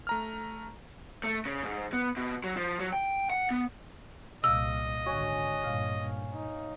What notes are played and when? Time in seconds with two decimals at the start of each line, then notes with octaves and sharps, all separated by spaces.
0.07 A3 A#5 F6
1.24 A3
1.45 C#3
1.63 G#2
1.93 B3
2.17 B2
2.44 F#3
2.57 F3
2.80 F#3
2.93 G5
3.30 F#5
3.51 B3
4.44 C2 A#2 D#5 F5 D6 E6
5.06 G#1 D3 F#4 C#5 G#5
5.64 G2 A#2 F5
6.33 D#4